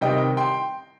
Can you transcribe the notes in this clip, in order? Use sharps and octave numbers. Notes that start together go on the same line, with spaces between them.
C3 D#3 G3 D#5 G5
G5 C6